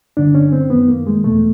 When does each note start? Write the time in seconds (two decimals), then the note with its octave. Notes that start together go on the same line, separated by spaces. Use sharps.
0.17 G2 D3 D4
0.35 C#4
0.52 C4
0.70 F#2 D#3 B3
0.88 A#3
1.07 G#3
1.24 E2 B2 A3